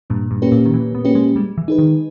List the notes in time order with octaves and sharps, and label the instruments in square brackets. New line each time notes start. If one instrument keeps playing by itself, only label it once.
[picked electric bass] G2 [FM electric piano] A#2
[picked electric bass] G2
[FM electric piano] A#3 C#4 G4 B4
[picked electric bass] A#2
D#3
[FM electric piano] A#2 [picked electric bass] E3
[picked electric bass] B3
[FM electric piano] A#3 C#4 G4 B4
[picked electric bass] G#3
[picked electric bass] G3 [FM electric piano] G#3
[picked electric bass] E3
[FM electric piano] D#4 G#4 B4
[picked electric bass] D#3